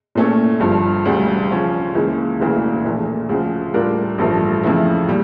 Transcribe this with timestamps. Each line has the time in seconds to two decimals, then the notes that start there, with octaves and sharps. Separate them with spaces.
0.15 A#2 A3 C#4 E4
0.60 G1 G2 F3
1.05 E1 D2 C#3 G3
1.50 C#3 F3 C#4
1.94 C#2 C#3 E3 A#3
2.40 E1 D2 C#3 E3 A#3
2.84 A#1 A#2 A3
3.29 D2 C#3 F3
3.74 A2 G3 D4 F4 A#4
4.18 A1 G2 F3 A3
4.63 F2 C#3 E3 A3 E4
5.08 A#2 G3